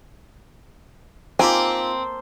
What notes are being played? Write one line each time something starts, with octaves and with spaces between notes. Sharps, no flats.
A#3 C4 D#4 F4 G4 C5 G#5 A5